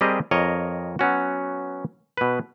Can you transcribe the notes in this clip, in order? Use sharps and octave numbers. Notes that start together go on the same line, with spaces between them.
G3 C4 G4 G#4 A#4 D#5
F2 A#4 C#5 D#5
F#3 B3 C#4 F#4
B2 B4